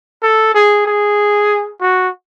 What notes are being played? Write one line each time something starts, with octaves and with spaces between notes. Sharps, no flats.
A4
G#4
G#4
F#4